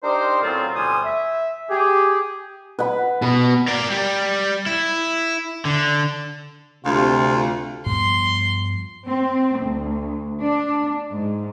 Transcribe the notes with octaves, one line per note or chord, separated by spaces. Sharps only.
D4 D#4 G4 A#4 C5
A2 C#3 F#3 C4 F4
D2 B2 G3 C5 G#5 D#6
E5
G4 G#4
B4 F#5 B5
B2 B4
A#4 D5
G3
E4
D3
D2 C3 F4
G2 F3 B3 C6
C4
D2
D4
G#2